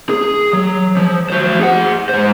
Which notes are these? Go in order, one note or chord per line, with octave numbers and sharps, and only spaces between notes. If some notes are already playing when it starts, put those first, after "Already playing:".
G#4
F#3
F3
F#4 C5
G#4 F#5
G#3 C5